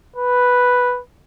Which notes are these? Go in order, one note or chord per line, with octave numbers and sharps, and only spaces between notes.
B4